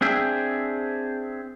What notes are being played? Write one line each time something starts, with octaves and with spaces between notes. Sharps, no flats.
C4 D4 G#4 E5 G5